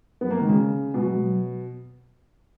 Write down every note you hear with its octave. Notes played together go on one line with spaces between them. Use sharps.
F#3 B3
A#3
D#3 G#3
C#3
B2 G#3
F#3
G#3
F#3